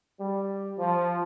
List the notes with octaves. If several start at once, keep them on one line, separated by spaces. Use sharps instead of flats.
G3
F3